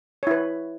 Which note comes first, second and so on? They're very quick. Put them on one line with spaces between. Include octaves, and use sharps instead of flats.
C#5 E4 B4